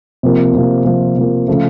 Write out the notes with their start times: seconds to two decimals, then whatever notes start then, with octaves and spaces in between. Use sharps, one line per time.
0.23 C3 F3 A#3
0.54 C3 F3 A#3
0.85 C3 F3 A#3
1.17 C3 F3 A#3
1.48 C#3 F3 A3